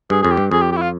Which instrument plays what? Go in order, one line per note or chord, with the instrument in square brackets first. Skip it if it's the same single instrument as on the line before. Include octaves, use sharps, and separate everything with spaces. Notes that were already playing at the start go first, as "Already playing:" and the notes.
[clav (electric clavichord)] G2 [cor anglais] G#4
[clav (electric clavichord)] F2 [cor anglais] G#4
[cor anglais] G4
[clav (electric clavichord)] G2
[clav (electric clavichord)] F2 [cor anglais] G#4
[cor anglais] G4
G4
E4
F4